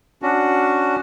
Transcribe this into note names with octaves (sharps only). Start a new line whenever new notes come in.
C#4 D4 F#4